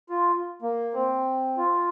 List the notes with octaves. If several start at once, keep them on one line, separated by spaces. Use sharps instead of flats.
F4
A#3
C4
F4